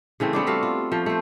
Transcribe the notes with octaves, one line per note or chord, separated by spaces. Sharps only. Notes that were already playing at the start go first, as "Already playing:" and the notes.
C#3 E3 A3 C4
A3 B3 C4 D4
G3 F#4 A4 F5
F4
F3 A3
A3 C5